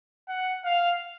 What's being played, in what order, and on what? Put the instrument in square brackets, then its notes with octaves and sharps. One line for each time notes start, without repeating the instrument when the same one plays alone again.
[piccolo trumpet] F#5
F5